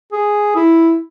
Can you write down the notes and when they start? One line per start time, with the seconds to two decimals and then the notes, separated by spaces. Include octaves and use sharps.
0.12 G#4
0.55 E4